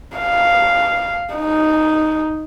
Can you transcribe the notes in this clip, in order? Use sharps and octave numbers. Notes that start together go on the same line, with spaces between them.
F5
D#4